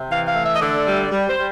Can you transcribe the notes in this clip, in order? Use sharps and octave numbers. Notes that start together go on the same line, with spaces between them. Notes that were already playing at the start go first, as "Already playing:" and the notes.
Already playing: C3
E3 F5
F5
A3
E5
D#5
D3 D5
G3
G3
C5
G3